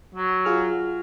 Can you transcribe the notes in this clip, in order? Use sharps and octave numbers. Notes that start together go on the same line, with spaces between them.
F#3
F4 G#4 F6